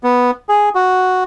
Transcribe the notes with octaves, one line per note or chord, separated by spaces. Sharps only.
B3
G#4
F#4